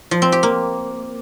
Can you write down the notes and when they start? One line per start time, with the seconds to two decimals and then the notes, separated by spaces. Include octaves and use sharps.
0.11 F3
0.22 C4
0.32 G4
0.43 A#3